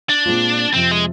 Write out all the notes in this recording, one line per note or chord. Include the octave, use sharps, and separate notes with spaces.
D4
A#2 G#3 C4 F4
F2 C3 F3 C4
G#3